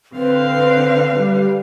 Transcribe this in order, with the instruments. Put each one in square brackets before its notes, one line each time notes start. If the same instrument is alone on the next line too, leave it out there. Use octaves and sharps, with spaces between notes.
[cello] D3 F5 [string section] C4 [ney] B4
[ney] B4
[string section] G3